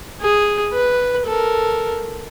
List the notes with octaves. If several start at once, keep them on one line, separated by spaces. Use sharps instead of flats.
G#4
B4
A4 A#4